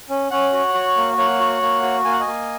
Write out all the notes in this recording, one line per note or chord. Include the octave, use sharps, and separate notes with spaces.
C#4
C#4 C#5 F#5
F#4
F#4
A#3
A#3 C#5 F#5
F#4
A#3
F#4
A#3 G#5
F#5
D#5 G#5
A#3